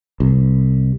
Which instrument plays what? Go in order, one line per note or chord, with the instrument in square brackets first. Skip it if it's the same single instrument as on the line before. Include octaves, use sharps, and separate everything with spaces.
[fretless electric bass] C2